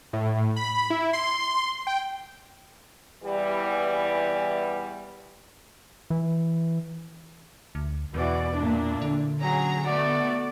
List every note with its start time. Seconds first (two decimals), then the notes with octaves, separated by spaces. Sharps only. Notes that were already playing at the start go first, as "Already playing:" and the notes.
0.13 A2
0.56 B5
0.90 E4
1.13 C6
1.87 G5
3.24 E2 E3 G3
6.10 E3
7.75 D2
8.14 E2 B2 E3 F#4 D5
8.56 A#2 D4 E4
9.02 D3
9.41 F#3 C#4 G#4 A#5
9.85 A3 B3 F#4 D5 F#5